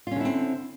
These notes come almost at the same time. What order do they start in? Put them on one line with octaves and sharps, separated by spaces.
F4 C#4 D3 E4 C4